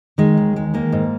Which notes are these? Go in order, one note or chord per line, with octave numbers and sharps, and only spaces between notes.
D#3 G#3
D#2
G#3
D#3 A#3
G#2